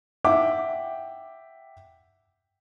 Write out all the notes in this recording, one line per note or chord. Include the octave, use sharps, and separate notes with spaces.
E5 F#5 G5 D6